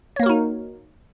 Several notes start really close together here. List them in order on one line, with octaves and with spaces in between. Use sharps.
C#5 A#3 A#4 F#4 D#4